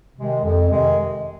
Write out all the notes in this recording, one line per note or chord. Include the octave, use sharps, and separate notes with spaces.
C3 D#3 G#3
F2
C3 D#3 G#3